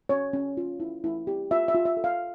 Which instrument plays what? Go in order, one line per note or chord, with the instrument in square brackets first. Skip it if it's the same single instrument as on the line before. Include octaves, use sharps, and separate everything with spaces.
[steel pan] C#4 C#5
C#4
F4
E4
E4
G4
F4 E5
E5
F4
E5
A4
F5